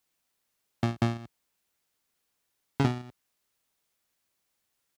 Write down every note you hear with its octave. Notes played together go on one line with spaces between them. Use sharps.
A#2
A#2
C#3
B2